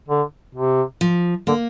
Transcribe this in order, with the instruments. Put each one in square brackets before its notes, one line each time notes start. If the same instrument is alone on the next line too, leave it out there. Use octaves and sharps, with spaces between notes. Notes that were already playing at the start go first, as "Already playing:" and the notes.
[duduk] D3
C3
[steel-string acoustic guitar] F3
[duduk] D3 [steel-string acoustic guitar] A#3